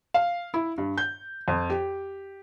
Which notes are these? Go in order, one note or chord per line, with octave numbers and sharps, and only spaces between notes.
F5
E4
G2
G6
F2
G4